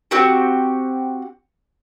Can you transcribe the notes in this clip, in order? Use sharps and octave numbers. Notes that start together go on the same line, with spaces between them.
C4 F#4 G4